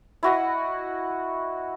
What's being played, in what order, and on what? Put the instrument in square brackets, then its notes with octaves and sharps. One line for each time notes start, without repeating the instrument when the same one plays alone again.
[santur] E4 F#4 D#5